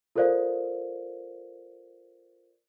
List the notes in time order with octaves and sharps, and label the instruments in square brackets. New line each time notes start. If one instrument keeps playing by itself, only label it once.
[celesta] F4 A4 A#4 C5 D5 F5